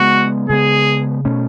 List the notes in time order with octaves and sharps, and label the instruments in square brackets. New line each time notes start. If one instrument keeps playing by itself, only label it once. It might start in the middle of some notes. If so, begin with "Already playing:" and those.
Already playing: [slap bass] C#3 G#3 B3 [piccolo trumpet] F#4
[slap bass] C#3 G#3 B3 [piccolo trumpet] G#4
[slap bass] B2 A3 C#4